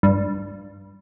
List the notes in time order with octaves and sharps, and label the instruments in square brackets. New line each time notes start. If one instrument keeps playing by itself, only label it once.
[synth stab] G2